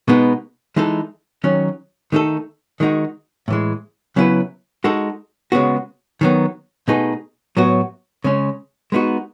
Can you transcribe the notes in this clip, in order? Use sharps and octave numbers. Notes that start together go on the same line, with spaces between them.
B2 G#3 B3 D#4
E3 G#3 D#4 A4
D#3 F#3 C#4
D#3 A3 D#4 A4
D#3 G#3 D#4 F#4
A2 E3 G#3
C#3 F#3 B3 E4 B4
G#3 D#4 F#4 A4
C#3 G#3 B3 F#4
D#3 F#3 B3
B2 A3 D#4 G#4 B4
A2 F#3 B3 F#4
C#3 G#3 C#4
G#3 B3 D#4 F#4